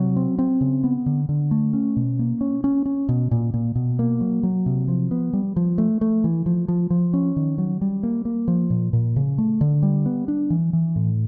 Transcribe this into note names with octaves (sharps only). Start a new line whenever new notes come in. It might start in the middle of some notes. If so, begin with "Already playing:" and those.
Already playing: C3 F#3
C4
C4
C#3
B3
D3
D3
A3
C#4
B2
A#3
C#4
C#4
C#4
B2
A#2
A#2
B2
A#3
F#3
F#3
C3
F3
B3
G3
F3
A3
A3
E3
F3
F3
F3
C#4
D#3
F#3
G3
A#3
A#3
F3
A#2
A#2
C#3
A3
D3
G3
B3
D4
E3
E3
A2